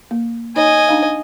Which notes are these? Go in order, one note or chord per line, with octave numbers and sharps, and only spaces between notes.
A#3
D#4 C#5 D#5 G#5
D4 D#4 F5